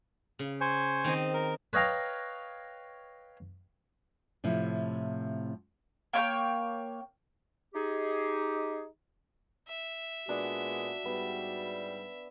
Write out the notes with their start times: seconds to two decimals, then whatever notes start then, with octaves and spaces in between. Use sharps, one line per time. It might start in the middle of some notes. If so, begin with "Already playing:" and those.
0.39 C#3
0.61 C5 G#5 C#6
1.04 D#3 C4 D#5
1.34 A#4
1.73 B4 C#5 D#5 F5 G5 A#5
4.44 A2 C3 F3 E4
6.13 A#3 C#5 E5 G5
7.75 D#4 G4 G#4
9.68 E5
10.29 A#2 G#3 B3 D4 F#4
11.05 G#2 G3 B3